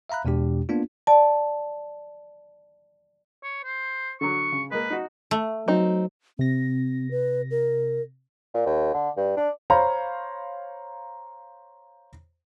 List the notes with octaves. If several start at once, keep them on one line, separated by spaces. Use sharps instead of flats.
E5 F5 A#5 B5 F#6
E2 B2 G#3 D4 G4
A#3 B3 D4 F4
D5 A5
C#5
C5
D3 F#3 C#6
C#3
G#3 A#3 B4
D#4 F#4
A3
F#3 C4 D#4
C3 C4 A#6
B4
A#4
A#2
D#2
D3
G2
D4
C5 C#5 F5 A#5 B5